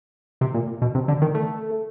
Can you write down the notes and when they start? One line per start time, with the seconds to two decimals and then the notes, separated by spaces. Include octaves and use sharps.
0.41 C3
0.54 A#2
0.82 B2
0.95 C3
1.08 D3
1.22 D#3
1.35 A3